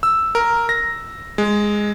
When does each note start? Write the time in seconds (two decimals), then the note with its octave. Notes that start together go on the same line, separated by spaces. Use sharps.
0.03 E6
0.35 A#4
0.69 A#6
1.38 G#3